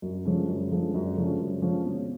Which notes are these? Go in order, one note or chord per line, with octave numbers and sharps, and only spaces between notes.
F#2
D3 F3 G#3 C#4
F#2
D3 F3 G#3 C#4
F#2
D3 F3 G#3 C#4
F#2
D3 F3 G#3 C#4
B2